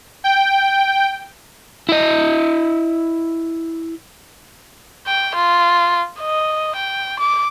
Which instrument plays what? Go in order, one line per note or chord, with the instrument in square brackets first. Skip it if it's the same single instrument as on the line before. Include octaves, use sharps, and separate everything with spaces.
[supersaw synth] G5
[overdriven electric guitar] E4 D#5
[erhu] G5
F4
D#5
G5
D6